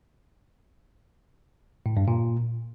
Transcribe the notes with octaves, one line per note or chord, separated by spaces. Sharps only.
A2
G2
A#2